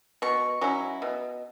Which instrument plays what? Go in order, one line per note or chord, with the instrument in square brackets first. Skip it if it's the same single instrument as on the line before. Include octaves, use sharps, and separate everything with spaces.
[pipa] B2 [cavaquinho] C#6
[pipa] F#3 C#4 E4
B2